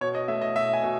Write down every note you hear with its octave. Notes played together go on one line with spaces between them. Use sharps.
B2 C#5
D#5
A3 E5
D#5
B2 E5
G#5
B2